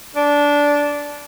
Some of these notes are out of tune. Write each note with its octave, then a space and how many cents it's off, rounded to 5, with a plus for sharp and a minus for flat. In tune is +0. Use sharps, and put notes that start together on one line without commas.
D4 -15